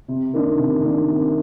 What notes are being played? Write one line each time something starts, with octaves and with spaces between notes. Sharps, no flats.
C3
D#3 A#3 D4
C3
D#3 A#3 D4
C3